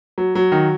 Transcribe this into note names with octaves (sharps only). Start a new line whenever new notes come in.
F#3
F#3
D#3